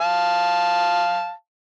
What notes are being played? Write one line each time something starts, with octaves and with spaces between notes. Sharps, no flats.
F5 A5